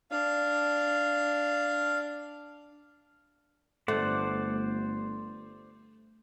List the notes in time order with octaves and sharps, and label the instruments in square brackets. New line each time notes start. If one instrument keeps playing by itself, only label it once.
[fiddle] D4 [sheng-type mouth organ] F5
[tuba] G1 [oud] A3 [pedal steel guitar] C5 D5 F#5